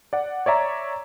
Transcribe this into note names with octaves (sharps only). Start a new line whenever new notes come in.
D5 F#5
C#5 D5 E5 A#5